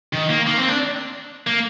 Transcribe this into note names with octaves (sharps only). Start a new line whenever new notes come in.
D#3
A#3
A#3
C4
D4
A#3